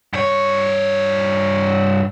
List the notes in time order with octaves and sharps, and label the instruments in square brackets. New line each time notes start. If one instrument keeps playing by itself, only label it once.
[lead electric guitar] G2 C#5